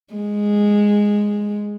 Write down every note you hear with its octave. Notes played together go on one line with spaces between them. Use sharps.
G#3